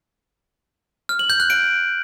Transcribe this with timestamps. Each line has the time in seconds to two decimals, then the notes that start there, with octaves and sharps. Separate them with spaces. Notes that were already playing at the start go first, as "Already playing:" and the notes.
1.09 F6
1.19 F#7
1.30 G6
1.40 F#6
1.50 D7